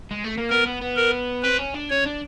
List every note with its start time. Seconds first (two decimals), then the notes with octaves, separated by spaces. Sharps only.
0.11 G#3
0.24 A3
0.38 A#3
0.50 B3 A#4
0.66 B3
0.82 B3
0.97 A#4
1.43 C4 B4
1.59 C#4
1.74 D4
1.90 C#4 C#5
2.05 D4